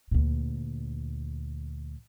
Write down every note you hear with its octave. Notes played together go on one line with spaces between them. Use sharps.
D2 A#2